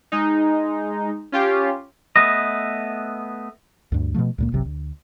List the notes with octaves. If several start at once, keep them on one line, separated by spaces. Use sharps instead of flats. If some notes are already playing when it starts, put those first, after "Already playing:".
G#3 D#4
C#4 F4 G4
A3 B3 B4 D#5
D2 G2
B2 D3 F3 A3
C#2 A#2 A#3
G1 C2 C3 F#3
D2